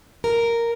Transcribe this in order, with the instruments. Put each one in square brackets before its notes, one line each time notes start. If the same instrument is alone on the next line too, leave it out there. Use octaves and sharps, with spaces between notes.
[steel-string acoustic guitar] A#4